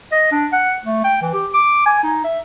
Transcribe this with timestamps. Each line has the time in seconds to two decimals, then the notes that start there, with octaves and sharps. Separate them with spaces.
0.12 D#5
0.32 D4
0.52 F#5
0.86 A3
1.04 G5
1.22 E3
1.34 G4
1.54 D6
1.86 G#5
2.03 D#4
2.24 E5